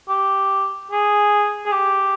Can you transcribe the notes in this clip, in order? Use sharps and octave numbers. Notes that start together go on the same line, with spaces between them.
G4
G#4
G#4
G4